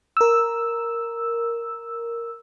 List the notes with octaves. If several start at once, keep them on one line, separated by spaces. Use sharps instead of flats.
A#4 E6